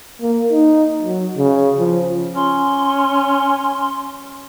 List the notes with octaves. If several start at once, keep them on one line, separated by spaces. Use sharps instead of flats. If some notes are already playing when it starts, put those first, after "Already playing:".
A#3
D#4
F#3
C#3
F3
C#4 C6